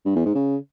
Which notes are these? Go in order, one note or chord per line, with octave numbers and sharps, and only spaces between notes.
G2
E2
G#2
C#3